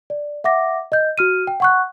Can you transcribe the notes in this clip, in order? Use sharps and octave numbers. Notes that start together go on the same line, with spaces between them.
D5
E5 F#5 D6 A#6
D#5 G6
F#4 F6 D#7
G5
F#5 C#6 F#6